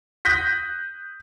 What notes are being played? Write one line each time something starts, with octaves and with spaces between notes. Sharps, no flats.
D#6 F#6 G6 A#6 B6